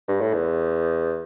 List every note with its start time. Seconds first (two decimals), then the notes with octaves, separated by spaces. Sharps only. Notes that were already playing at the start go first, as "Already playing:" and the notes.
0.08 G2
0.21 A2
0.34 E2